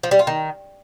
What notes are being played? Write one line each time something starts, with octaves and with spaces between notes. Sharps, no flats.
F3
G3
F4
D#3